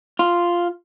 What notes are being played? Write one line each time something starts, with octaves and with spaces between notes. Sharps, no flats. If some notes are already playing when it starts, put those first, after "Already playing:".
F4